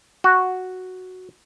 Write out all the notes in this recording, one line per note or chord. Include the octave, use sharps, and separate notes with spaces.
F#4